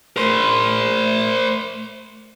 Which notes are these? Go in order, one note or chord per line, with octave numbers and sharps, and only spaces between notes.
A3 A#4 C5